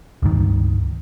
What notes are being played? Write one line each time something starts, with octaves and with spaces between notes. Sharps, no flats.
C#2 G2 D#3